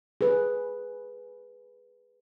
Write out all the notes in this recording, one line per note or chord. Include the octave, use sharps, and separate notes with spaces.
G#4 B4